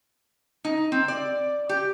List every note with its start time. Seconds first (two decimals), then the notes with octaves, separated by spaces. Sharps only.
0.65 D#4
0.92 C4
1.08 D5
1.69 G4